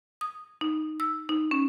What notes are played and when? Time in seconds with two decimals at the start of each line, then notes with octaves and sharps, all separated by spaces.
0.21 D#6
0.61 D#4
1.00 E6
1.29 D#4
1.51 C#4